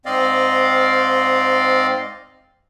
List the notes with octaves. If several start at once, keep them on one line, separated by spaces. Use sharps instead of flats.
G#2 C4 D5 D#5 F5